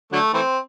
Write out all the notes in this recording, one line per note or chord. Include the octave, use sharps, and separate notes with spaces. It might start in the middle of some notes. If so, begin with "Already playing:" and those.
D3 F#3 A3
E3 A3 C4